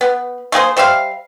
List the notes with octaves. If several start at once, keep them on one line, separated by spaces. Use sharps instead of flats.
B3
A3 A#3 G#4 C5
G3 C5 E5 F5